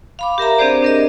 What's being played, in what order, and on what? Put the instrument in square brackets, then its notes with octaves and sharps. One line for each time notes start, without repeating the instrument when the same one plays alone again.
[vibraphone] F5 B5 D6
G4 A#4 E5 A#5
C4 D4 G4 G#4 C5 D5
D4 A#4 D#5